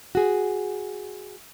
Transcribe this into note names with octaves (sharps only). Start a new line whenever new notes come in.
F#4 G#4